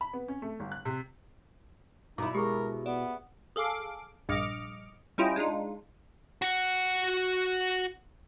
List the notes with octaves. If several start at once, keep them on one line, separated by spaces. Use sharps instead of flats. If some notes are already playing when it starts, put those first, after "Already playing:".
B5
B3
C#4
A3
G1
F#6
C3
B2 D#4 E4 F5 D6
G#3 G4 G#4 A#4 C#6
B3 D5 E5
G#4 A4 F5 D6
A#1 G2 D#5 D6 F6 C#7
G3 C#4 E4 F4 D#5 G5
G#3 D4 D#4 F4
F#4 F#5